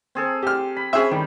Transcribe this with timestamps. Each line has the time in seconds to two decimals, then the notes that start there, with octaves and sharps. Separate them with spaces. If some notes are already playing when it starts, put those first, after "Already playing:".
0.15 C4 G#4 A4
0.43 G4 F6
0.77 B5
0.93 C4 C#4 G#4 E5
1.11 D#3 G3